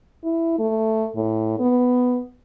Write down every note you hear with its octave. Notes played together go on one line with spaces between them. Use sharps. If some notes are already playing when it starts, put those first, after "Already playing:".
E4
A3
A2
B3